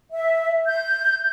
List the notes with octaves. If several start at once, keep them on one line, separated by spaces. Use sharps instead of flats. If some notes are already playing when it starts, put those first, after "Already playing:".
E5
G6